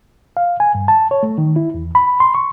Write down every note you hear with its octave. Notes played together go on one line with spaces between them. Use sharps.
F5
G#5
G2
A5
C#5
A3
D#3
E4
E2
B5
C6
C#6